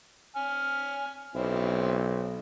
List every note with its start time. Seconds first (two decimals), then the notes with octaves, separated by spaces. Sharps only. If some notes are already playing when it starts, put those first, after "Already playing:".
0.36 G#5 F6
1.35 B1 C4 C#4 E4